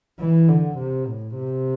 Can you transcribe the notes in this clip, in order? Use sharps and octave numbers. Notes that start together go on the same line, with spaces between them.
E3
D3
C3
A2
C3